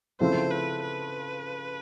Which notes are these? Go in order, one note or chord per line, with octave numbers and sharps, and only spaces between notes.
C#3 F3 A3 C4 E4 C5
B4
B4